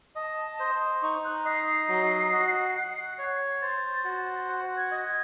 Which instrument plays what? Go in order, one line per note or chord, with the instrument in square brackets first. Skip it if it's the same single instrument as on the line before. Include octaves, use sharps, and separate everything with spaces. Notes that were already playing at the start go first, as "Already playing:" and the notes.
[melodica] D#5 [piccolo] A5
[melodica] C5
[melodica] D#4 [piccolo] C#6
[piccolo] F#6
[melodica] D#5 [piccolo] C7
[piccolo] C7
[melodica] F#3
F#4
F#5
C#5
[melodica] C5 [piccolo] A6
[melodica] F#4
F#5
[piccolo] G#6
[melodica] D#5
[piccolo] G#6